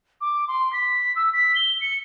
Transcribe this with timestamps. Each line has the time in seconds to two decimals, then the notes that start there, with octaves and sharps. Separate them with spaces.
0.21 D6
0.48 C6
0.73 B6
1.16 E6
1.33 B6
1.55 G7
1.81 C#7